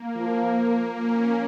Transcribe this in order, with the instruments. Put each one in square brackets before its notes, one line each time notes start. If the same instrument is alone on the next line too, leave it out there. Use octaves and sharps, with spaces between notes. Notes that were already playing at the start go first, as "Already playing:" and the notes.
Already playing: [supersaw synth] A#3
[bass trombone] F3
[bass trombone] F3 [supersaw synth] A#3 C#4